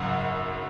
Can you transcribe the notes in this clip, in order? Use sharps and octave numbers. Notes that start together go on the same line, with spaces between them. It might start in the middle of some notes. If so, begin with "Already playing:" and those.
Already playing: G#1 F#2 C#3 F#5